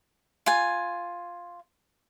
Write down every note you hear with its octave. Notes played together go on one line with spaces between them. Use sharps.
F4 G#5